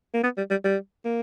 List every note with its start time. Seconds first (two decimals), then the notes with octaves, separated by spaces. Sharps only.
0.14 A#3
0.24 B3
0.37 G3
0.50 G3
0.65 G3
1.05 A#3